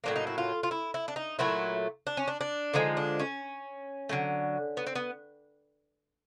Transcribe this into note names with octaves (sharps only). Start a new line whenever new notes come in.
A2 F#3 A#3 D4
D#4
E4
F4
F4
E4
E4
D4
D#4
A#2 F#3 A3 E4
D4
C#4
D4
D4
D3 F3 G#3 D#4
D4
C#4
D3 F#3 A3
B3
C4
B3